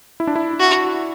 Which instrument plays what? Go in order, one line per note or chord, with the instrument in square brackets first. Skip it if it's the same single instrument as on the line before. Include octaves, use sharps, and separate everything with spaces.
[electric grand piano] E4
D4
E4
[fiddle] F#4